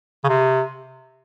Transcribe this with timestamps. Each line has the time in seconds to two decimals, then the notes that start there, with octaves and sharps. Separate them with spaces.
0.24 C#3
0.29 C3